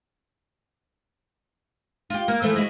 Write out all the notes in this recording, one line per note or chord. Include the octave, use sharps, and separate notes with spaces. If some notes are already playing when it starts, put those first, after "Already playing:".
F4 G4
A#3
E3 F3 A3
G#3 E4 F#4